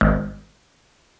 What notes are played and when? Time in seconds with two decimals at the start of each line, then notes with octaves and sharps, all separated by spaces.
0.01 G#1